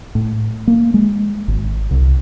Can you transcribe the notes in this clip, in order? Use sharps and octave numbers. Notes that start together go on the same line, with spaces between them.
A2
A#3
G#3
G#1
C2